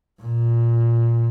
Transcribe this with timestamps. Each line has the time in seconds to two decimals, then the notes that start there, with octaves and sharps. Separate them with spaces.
0.22 A#2